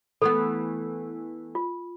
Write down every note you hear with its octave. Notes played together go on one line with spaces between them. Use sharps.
E3 A3 B3 A4
F4